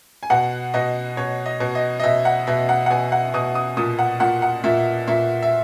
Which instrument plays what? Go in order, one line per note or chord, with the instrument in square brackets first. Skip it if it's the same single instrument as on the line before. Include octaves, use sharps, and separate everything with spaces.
[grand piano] G#5
B2 F#5
B2 D#5
B2 C#5
D#5
B2
D#5
D#5
B2 E5
F#5
B2 E5
F#5
F#5
B2 G#5
F#5
B2 D#6
D#6
A#2 D#6
F#5
A#2 F#5
F#5
A#2 E5
A#2 E5
E5